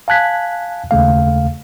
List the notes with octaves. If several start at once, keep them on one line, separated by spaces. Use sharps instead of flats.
F5 G#5 A5 F#6 G#6 B6
D#2 C#3 A3 F5